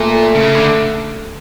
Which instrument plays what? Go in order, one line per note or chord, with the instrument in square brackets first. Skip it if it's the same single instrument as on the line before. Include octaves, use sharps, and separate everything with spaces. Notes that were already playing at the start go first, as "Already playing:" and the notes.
Already playing: [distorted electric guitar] A#2 [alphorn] A3
[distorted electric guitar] C#3
D3